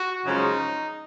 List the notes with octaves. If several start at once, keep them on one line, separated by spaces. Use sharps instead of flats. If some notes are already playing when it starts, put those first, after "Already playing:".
Already playing: F#4
F#2 C#3 F3 G#3 C#4 D#4